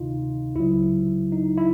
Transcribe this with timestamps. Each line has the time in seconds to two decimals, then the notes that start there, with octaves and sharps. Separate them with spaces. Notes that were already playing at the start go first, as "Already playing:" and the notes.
Already playing: D2 C3 D#3 D#4 F4
0.55 C#2 C#3 F#3 E4
1.32 D#4
1.58 E4